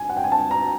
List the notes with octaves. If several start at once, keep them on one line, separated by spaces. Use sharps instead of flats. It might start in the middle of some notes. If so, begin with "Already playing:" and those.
Already playing: G#5
F#5
G5
G#5
A5
A#5